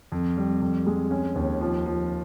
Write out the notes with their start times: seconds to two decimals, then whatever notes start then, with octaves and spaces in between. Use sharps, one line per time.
0.12 F2
0.37 G3
0.62 F2
0.87 G#3
1.11 C#4
1.36 D#2
1.61 F3
1.86 F3